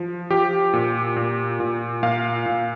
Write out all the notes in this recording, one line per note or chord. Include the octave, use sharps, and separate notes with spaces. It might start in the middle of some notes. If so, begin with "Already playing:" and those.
Already playing: F3
F3 G4
A#2
A#2
A#2
A#2 F5
A#2